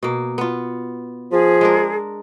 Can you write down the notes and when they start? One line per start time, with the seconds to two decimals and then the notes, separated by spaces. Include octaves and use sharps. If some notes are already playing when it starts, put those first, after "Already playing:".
0.03 B2 A#3
0.38 B3 F4
1.32 F3 G#4
1.61 G#3 D4 A#4